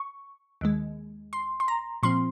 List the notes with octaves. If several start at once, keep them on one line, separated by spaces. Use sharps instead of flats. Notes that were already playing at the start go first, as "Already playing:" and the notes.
Already playing: C#6
D#2 D#3 G#3
C6
C6
A#5
A#2 F3 C4 C6